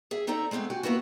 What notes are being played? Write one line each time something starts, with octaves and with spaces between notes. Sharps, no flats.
G#4 E5
C4 D#4 A4 D5 E5 A#5
G#3 A3 B3 C4 D4
F#4 G4 G#5
A#3 B3 E4 F#4